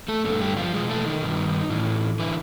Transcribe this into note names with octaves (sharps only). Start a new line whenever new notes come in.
A3 A4
G2 D3 A3 A4
G3 G4
F3 F4
E2 B2 G#3 G#4
A3 A4
D#3 D#4
G2 D#3
A2 E3
D3 E3 E4